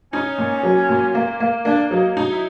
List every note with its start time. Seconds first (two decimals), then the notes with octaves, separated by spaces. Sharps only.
0.12 C#4 D#4
0.38 A#2
0.63 F#3
0.89 A#2
1.15 A#3
1.40 A#3
1.65 A#3 D4
1.90 F#3 D#4
2.17 D#4
2.30 E4